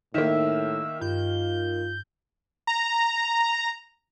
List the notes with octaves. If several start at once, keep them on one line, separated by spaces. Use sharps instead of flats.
A2 D#3 A#3 E5
G2 F4 G6
A#5